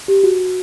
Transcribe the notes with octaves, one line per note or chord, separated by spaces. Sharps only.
G4
F#4